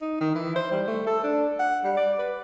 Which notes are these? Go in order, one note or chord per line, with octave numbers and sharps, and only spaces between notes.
D#4
D#3
E3
C5
G3
A3
A4
D4
F#5
G3
D5
B4